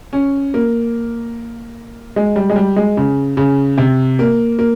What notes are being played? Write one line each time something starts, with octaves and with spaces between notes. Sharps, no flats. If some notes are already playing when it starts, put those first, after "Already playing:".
C#4
A#3
G#3
G3
G#3
G3
G#3
C#3
C#3
C3
A#3
A#3